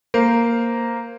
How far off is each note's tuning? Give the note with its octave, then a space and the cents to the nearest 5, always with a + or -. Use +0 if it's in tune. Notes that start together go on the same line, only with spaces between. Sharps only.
A#3 +0 C5 +0